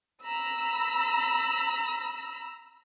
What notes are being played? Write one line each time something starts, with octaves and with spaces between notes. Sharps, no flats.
A#5 B5 E6